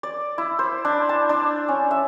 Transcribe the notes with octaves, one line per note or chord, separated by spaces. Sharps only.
D5
E4
C5
D4
A5
D4
C#4
E5